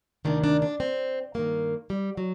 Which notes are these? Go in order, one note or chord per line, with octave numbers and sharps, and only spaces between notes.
D2 C3 D#3 D4
D4
D4
C4
G2 D#3 A#3
G3
F#3